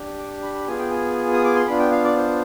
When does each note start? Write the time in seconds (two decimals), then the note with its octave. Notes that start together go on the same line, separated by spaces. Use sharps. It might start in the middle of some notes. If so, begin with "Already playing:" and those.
Already playing: D4 G4
0.18 D6
0.43 B5
0.55 B5
0.67 B3 F4 G#4 G#5
0.79 G5
0.91 G#5
1.33 D#6
1.44 D6
1.56 C6
1.67 B3 D4 F4 B5
1.79 G5
1.91 F5
2.04 D5
2.17 C5